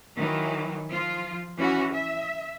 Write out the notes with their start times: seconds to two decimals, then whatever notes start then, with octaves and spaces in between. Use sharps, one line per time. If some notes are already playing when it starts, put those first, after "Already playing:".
0.18 D#3 E3 F#3
0.90 F3 F4
1.57 E3 C#4 F#4
1.93 E5